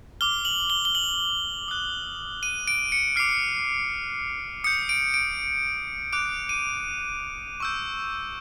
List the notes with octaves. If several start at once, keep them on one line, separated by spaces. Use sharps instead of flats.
D6 F6 G7
F#7
G7
G7
F#7
D#6 F#6
D#7
D7
C#7
D6 F6 C7
D#6 G6 C#7
D7
D7
D6 F#6 D7
D#7
C#6 E6 G6